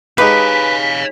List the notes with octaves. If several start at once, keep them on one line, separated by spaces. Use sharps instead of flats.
G#3 D#4 G4 B4 C#5 F5 B6